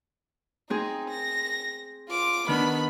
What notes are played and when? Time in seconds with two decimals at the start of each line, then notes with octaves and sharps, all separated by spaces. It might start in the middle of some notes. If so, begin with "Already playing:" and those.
0.70 C4 D#4 G#4
1.10 A#6
2.09 F4 D6
2.48 D#3 B3 D4 B5